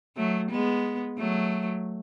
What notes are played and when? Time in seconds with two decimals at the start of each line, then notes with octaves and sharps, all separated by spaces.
0.16 F#3 A3
0.51 G#3 B3
1.18 F#3 A3